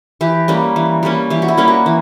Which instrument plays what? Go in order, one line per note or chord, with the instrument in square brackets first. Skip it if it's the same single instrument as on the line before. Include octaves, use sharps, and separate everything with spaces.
[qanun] E3 G4
G3 A#3 C#4
E3
G3 A#3 C#4
E3 G4
F#4
E4
G3 A#3 C#4
F#4
E3